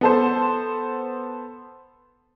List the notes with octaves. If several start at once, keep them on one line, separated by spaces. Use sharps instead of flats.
B3 A4 C5